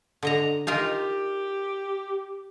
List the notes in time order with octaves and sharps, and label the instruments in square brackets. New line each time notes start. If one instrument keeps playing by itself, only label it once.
[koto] D3 D#5 A#5
[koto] D#4 F4 A#4 [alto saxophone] G4